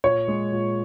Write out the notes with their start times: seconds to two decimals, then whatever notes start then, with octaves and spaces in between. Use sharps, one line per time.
0.04 A#2 C#5
0.28 G#3
0.52 A#2